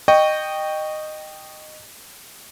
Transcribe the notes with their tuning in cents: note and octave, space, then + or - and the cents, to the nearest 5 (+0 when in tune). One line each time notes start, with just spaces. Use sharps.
D#5 -15 G5 +0 C#6 +5